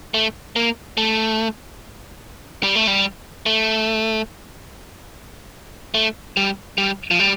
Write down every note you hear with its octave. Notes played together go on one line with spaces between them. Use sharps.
A3
A#3
A3
G3
A3
G3
A3
A3
G3
G3
F3
G3